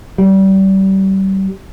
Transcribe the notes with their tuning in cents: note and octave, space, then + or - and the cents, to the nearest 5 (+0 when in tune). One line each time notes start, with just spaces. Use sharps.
G3 -30